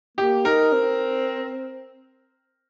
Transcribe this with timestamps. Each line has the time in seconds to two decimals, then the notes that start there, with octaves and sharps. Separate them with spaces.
0.17 A#3 G4
0.45 D#4 A#4
0.73 C4